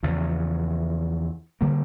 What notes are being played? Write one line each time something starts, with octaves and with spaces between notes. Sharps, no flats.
E2 C#3 F3
D3 G3 A#3